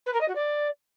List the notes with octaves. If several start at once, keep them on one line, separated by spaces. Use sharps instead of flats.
B4
A#4
D#5
F#4
D5